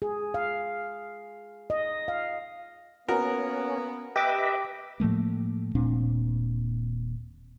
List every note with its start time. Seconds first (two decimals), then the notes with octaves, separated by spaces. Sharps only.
0.02 G#4
0.34 F5
1.70 D#5
2.08 F5
3.08 A#3 B3 C#4 F#4 A#4
4.16 G4 B4 D#5 E5 D6
5.00 A2 F3 A3 A#3
5.75 D#1 A#2 C4 D4